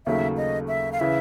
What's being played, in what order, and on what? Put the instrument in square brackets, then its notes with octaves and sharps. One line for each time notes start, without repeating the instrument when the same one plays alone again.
[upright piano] D#2 C#3 F#3 A3 [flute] E5
[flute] D#5
E5
F5
[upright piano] C#3 E3 [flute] E5